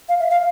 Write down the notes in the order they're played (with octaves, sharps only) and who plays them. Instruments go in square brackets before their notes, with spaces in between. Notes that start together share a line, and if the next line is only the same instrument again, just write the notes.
[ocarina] F5
E5
F5